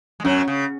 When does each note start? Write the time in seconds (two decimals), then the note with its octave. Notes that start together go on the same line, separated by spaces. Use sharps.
0.20 G#3
0.24 F#2 F#3 C#4
0.48 C#3